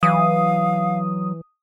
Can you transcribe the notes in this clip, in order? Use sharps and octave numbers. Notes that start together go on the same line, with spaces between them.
E3 F#3 F5 D#6